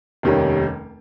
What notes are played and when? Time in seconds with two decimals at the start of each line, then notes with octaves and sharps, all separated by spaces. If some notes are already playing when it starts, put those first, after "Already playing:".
0.23 F1 D#2 D#3 G3 C#4